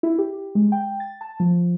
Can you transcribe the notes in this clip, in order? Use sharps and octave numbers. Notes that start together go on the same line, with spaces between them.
E4
G4
G#3
G5
A6
A5
F3